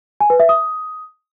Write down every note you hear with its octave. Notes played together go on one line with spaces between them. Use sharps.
G#5
B4
E5
D#6